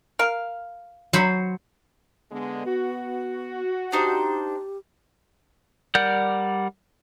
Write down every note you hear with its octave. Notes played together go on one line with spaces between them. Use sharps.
A#4 F5
F#3 C5 B5
D3 G#3 B3
F#4
D4 D#4 G4 C5
G3 A#4 D5 F#5 G6